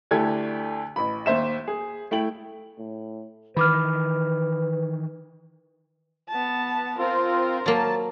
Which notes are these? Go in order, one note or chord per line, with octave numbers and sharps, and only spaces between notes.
D2 D3 E4 G4 A4 G#6
A1 B5
D#2 C5 E5 E7
G#4
A3 E4 G5 F#7
A2
D#3 E3 B4 B5 D6 F6
B3 A5
C4 F4 A#4 C5
F#3 A#3 A5